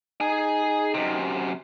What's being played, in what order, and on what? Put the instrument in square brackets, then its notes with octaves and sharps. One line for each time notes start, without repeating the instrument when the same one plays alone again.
[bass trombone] D#4 [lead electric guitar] G#4 G#5
[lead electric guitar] F#2 C3